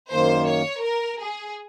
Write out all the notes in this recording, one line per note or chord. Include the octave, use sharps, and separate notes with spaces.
F#2 D#3 A#3 C5
C#5
A#4
G#4